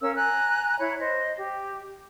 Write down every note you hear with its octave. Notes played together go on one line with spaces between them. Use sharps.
C#4 A#4 F5 E6
G#5 A#5 F#6
E4 C#5 B5
C5 D#5
G4